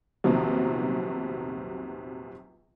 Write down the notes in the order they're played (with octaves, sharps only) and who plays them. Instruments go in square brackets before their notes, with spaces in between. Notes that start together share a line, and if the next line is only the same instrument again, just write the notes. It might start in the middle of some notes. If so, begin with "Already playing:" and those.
[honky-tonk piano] A#1 E2 C3 D#3 F3 F#3